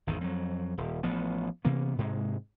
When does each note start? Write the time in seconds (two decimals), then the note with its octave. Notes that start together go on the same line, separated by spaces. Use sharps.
0.07 G#1 E2 D#3
0.21 F2 F#3
0.78 D#1
1.03 A1 F3 B3
1.65 C3 E3 A#3 B3
1.99 G#2 C3 G#3